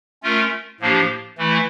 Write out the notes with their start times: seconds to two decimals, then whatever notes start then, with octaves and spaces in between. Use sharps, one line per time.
0.23 A3 C#4 F4 A#4
0.80 A2 F3 A#3 D4 G4
1.38 E3 A3 E4